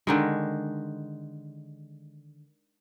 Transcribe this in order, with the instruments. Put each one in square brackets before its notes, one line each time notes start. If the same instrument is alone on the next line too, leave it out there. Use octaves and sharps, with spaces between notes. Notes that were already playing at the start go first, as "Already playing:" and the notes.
[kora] D3 D#3 G#3